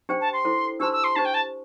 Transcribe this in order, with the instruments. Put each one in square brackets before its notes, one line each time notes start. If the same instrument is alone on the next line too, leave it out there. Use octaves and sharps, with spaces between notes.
[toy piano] D4 G4 C5 G5
[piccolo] A5
C6
[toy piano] E4 A4 C5
[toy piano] D4 G4 C5 A5 C6 [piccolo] E6
[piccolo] E6
C6
[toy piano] D4 G4 C5 [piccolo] A5
[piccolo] G5
A5